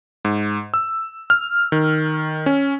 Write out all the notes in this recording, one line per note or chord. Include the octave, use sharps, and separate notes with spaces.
G#2
E6
F6
D#3
C#4